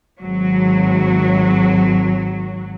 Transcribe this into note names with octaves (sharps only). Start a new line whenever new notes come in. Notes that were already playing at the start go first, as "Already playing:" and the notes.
G#1 F#3